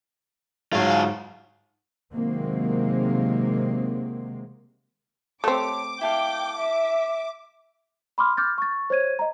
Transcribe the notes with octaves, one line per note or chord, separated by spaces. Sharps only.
G#2 F#3 F4 C#5 F5
C3 D#3 F#3 G#3 A#3 C4
A3 C4 G4 A4 C#5 D6
E4 A4 F5 G5
E5
B5 C6 D6 F6
D6 F6 G6 A6
C#6 A6
C5 C#5 G#6 D#7
D#5 A#5